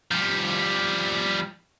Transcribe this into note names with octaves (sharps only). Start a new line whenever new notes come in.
F3 G3